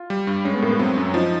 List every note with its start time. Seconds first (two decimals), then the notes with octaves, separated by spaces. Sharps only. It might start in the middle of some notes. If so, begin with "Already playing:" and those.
Already playing: F4
0.10 G3
0.27 G2
0.45 G#3 C#4
0.54 B3
0.62 A2 A#3
0.71 B3
0.79 F#3 C4
0.97 F#2 C#4
1.14 F3 D#4